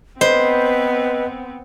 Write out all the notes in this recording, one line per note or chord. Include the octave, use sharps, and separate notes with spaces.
B3 C4 B4 C5 D#5